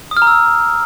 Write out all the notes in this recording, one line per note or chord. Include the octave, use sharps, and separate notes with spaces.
D#6
F6
A#5
E6